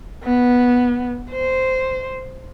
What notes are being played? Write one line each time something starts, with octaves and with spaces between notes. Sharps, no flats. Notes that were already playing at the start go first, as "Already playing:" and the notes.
B3
C5